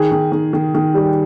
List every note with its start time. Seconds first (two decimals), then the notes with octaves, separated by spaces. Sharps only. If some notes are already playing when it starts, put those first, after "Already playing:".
Already playing: D#3 G#4
0.12 D#3
0.32 D#3
0.53 D#3
0.75 D#3
0.94 G3